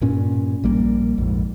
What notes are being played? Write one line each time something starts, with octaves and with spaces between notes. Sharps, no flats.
G2 A#2 C#4
A#1 G3 A#3
A#1 F2 G#2